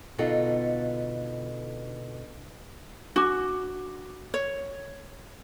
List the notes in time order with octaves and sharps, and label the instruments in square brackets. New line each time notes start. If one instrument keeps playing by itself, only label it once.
[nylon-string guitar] B2 D3 B3 D#4 F4 A4
[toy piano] D4 D6 [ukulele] F#4
[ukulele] C#5